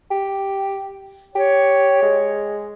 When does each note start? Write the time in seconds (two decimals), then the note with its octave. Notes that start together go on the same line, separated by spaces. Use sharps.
0.11 G4
1.35 G4 C#5
2.03 G#3